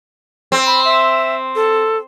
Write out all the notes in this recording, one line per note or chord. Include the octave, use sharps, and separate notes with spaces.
C4
B5
E5
A4